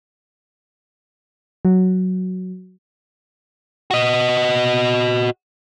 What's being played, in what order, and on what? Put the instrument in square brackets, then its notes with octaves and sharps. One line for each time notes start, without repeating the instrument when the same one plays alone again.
[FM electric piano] F#3
[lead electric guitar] F#4 D#5